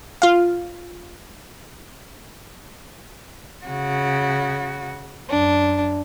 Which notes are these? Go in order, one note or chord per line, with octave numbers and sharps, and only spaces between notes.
F4 F5
C#3 F#4
F#2 D4